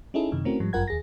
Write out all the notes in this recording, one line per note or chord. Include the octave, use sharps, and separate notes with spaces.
C#4 D#4 E4 G#4 A4
F#2 C3 D#3 D#4
A3 C4 C#4 E4 F#4 A#4
G#2 F3 G3
G1 F#2 F4 A#4 F#5 G#6
D#2 G#4 A#6